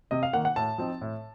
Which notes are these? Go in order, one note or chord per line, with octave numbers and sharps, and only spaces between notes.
C3 D#5
F5
D#3 A#3 F#5
F#5
A2 A5
F3 C4 D#4
A2